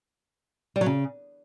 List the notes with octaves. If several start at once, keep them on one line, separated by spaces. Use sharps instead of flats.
G3
F#3
C#3